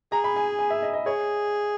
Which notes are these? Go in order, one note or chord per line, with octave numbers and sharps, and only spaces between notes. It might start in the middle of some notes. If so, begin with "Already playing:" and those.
G#4 A#5
B5
G#5
G#5
E5
D#5
D#5
G#4 C#5